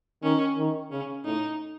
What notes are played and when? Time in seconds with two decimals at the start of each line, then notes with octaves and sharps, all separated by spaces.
0.24 D#3 C#4
0.58 D#3
0.91 C#3 C#4
1.25 A2 D#4